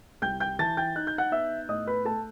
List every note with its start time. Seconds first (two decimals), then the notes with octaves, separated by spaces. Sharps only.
0.22 C2 G5 G6
0.40 G5 G6
0.59 E3 A5 A6
0.77 G5 G6
0.95 D#4 F#6
1.07 G6
1.18 F#5 F#6
1.32 B3 E5 E6
1.69 A2 D#5 D#6
1.87 B4 B5
2.05 A3 A4 A5